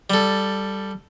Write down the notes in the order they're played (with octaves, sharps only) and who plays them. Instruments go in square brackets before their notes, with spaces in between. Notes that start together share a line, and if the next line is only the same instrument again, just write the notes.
[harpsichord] G3 A4